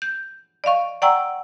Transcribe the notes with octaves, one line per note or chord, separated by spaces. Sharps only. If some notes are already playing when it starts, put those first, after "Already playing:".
G6
D5 D#5 F5 C#6
D5 F#5 G5 A#5 C#6 E6